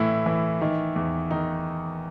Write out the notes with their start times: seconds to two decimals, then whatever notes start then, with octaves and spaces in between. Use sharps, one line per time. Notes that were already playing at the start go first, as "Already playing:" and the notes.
Already playing: A2 E3 E4
0.26 E3
0.61 D#3
0.96 E2
1.31 D#3 D#4